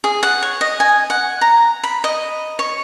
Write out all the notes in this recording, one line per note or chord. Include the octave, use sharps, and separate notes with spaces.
G#4
F#5
C#5
D#5
G#5
F#5
A#5
B5
D#5
C#5